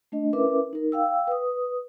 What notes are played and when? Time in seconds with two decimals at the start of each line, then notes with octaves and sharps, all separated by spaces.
0.12 A3 D4 D#5
0.33 C#4 E4 A#4 B4 E5 D6
0.73 D#4 A#4
0.92 F5 G5 E6
1.27 B4 D#6